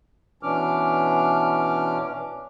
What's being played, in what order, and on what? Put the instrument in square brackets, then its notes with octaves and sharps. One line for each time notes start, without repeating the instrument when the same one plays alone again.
[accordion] B2 E3 C#4 D4 D6 F6